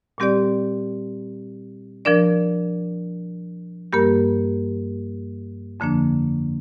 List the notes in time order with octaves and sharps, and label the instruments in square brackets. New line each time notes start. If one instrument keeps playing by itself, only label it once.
[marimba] A#2 G3 C4 G4 D5
F3 D4 A#4 D5
G2 G3 A#3 G4 A#4
F2 D3 F3 A#3 D4